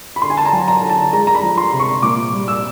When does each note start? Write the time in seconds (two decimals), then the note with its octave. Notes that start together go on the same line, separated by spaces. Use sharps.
0.16 B5
0.22 D3 C6
0.30 G#5
0.37 A5
0.45 A#5
0.53 F#3
0.68 A#5
0.82 D3
0.90 A5
1.13 G#3 A#5
1.27 A#5
1.35 B5
1.43 F3
1.58 C6
1.73 C3
1.80 C#6
2.03 A#2 D6
2.32 G3
2.48 E6